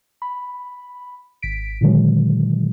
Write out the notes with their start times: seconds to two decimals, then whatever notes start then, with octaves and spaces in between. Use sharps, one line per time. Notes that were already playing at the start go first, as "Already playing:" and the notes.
0.22 B5
1.42 G#1 B6 D7
1.81 A#2 D3 D#3 F#3 G#3